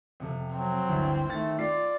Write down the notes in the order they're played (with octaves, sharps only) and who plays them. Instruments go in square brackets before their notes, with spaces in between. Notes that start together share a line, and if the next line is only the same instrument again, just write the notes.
[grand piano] F2 C3 A4
[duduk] F#3 [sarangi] C4
[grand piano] G1 D2 E4
[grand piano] D#3 A6 [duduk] A3
[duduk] F4 [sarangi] D5 [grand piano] C7